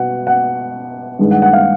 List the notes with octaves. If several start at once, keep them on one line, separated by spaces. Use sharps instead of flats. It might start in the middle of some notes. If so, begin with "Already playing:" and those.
Already playing: B2 F#5
F#5
G2 D#3 G#3
F#5
F#5
F5